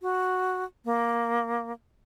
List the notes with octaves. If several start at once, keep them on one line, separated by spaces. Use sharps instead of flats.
F#4
A#3